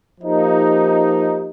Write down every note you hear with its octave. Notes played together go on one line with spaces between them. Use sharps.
F3 A#3 D#4 G4